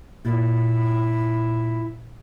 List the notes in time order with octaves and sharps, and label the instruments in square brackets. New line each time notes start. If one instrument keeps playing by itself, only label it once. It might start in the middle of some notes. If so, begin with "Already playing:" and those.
[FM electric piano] A#2 [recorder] E4